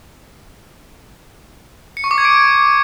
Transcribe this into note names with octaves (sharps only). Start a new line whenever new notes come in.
C#7
C#6
D6
G#6
D7